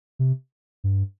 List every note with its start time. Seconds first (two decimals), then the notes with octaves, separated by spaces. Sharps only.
0.19 C3
0.84 G2